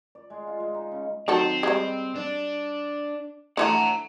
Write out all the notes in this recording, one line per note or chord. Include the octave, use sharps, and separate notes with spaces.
D5
G#3
F4
G#3
D#4
C#3
D#3 F#3 C4 A4
G3 G#3
D4
D3 E3 A3 F#5 A#5